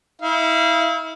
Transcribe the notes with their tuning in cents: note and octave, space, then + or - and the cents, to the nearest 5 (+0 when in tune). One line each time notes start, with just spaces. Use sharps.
E4 -35 F5 -35